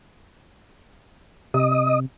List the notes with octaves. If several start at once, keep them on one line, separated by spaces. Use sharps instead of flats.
C3 D#5